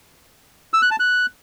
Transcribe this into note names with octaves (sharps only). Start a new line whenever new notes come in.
E6
F#6
A5
F#6